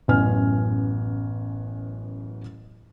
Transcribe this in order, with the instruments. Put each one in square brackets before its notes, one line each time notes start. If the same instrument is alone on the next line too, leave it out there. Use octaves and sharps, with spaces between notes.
[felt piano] A1 F#2 B3 G#5 F6